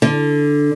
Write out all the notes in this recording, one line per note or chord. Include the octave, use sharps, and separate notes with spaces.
D3